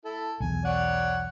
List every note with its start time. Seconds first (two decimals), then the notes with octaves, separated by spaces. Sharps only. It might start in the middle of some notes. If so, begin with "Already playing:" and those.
0.05 E4 A4
0.40 B1 E2 G#5
0.65 C#5 D5 F#5